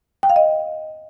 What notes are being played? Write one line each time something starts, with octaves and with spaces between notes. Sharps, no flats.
G5
F5
D#5